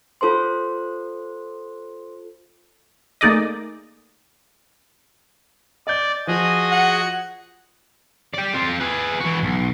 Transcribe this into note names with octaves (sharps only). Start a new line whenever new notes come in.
F4 A4 C5 C6
A3 A#3 D#4 G#4 D5 D#5
D5 D#5 G6
F3 F#4 G#4 D#5
F#5
G4 D5
C4 F4
G#4 B4
E3 F#4
B1